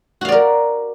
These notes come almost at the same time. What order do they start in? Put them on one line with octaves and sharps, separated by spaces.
F#4 F5 D5 A#4